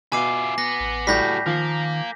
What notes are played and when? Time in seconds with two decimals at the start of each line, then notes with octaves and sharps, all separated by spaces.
0.12 B2 E4 F4 G#5 D6 C7
0.58 B3 A#6
0.80 A1
1.07 A2 G3 F#4 A4 G6 A#6 B6
1.46 D#3 F3 A#4 F5